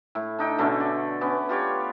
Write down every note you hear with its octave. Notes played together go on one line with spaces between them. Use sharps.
A2
D4 D#4 G5
B2 D3 A3 C#4
D5
B3 C#4 D6
F4 G4 C#5 D5